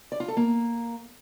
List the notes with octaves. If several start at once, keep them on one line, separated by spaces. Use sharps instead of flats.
D5
F4
A4
A#3